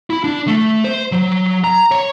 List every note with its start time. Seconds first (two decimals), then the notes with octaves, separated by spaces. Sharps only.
0.10 E4
0.24 D4
0.47 A3
0.84 C5
1.12 F#3
1.64 A#5
1.92 C#5